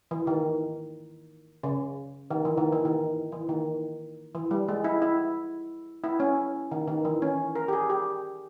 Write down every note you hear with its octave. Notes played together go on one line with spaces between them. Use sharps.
E3
D#3
C#3
D#3
E3
D#3
E3
D#3
E3
D#3
E3
G3
G#3
E4
E4
E4
C#4
D#3
D#3
E3
C#4
A#4
G4
G#4
G4